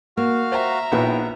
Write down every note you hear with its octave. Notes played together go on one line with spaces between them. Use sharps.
A#3 F#4 F5 F6
C5 E5 G5 A#5
A#1 B3 D#4 E4 C#5 G5